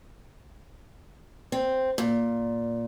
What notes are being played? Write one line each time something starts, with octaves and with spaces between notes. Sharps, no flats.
C4
A#2